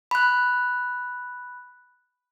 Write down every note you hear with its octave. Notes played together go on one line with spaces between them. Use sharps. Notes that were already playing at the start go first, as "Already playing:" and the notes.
B5 F#6